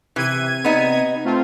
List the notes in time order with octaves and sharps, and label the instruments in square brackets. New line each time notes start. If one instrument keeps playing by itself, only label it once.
[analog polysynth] C3 G#6 D#7 [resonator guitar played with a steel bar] E3
[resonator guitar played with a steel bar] B3 D#4
[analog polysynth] A3 C4 F4